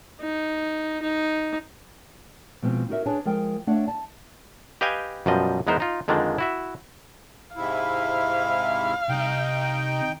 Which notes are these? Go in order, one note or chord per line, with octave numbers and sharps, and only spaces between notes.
D#4
D#4
B2 F3 G#3 C4
D#4 F#4 A#4 E5
D4 G#4 B4 C#5 G#5 A5
F3 G#3 A#4 G5
A3 D4 C#5 D5 F5 F#5
A5
G4 B4 D#5 F5 G5 G#5
F#2 B2 F3 G3 D#5
E2 G#3 B3 D#4 A#4 C5
D#4 F4
F2 D3 D#3 F3 G#3 D4
E4 F#4 E5
G#2 C3 E4 F5
C2 C3 D#4 G5